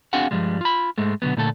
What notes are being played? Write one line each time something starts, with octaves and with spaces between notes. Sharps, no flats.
C4 D4 F#4 G#4 F5 F#5
G2 B2 F3 G3 G#3
F4 B5
G#2 G#3 A3
B2 D3 F#3 B3
A#2 D3 A3 D4 A4